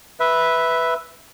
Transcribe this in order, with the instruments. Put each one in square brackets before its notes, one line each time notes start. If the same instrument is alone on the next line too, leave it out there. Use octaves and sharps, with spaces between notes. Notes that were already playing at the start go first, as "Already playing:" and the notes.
[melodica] B4 E5